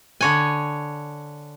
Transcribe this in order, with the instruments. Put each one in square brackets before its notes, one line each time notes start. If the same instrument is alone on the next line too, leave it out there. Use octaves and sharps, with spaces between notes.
[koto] D3 C#5 G#5